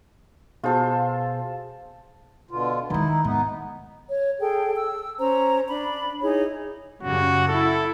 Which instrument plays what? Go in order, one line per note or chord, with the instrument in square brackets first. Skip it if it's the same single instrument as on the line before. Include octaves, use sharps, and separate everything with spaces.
[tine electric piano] B2 G#4 C5 [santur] F4 A4
[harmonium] B2 D3 F4
[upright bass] D#3 G#3 [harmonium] D#4 E4
[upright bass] G#2 [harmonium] B3 D#4
[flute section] C#5
G#4 A4 G5
E6
C#4 C5 A#5
D4 B5
D#4 E4 G#4 C#5
[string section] F#2 C#3 G3 [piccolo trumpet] F#4
[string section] E4 [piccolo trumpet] A4